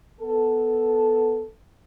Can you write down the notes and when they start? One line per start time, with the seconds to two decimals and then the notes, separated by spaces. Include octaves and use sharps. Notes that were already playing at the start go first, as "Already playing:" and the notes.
0.21 B3 A4